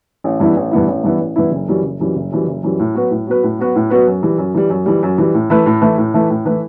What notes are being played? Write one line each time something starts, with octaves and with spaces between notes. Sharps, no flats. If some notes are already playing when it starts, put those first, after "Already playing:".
A1
G2 E3 B3 E4
A1
G2 E3 B3 E4
A1
G2 E3 B3 E4
A1
G2 E3 B3 E4
F#1
F#2 E3 G3
F#1
F#2 E3 G3
F#1
F#2 E3 G3
F#1
F#2 E3 G3
A2
F#3 B3 F#4 B4
A2
F#3 B3 F#4 B4
A2
F#3 B3 F#4 B4
A2
F#3 B3 F#4 B4
F#2
E3 G3
F#2
E3 G3
F#2
E3 G3
F#2
E3 G3
A2
E3 A3 E4 B4
A2
E3 A3 E4 B4
A2
E3 A3 E4 B4
A2
E3 A3 E4 B4